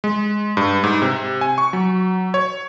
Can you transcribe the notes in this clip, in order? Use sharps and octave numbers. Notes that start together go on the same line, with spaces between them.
G#3
G2
G#2
C3
G#5
C#6
F#3
C#5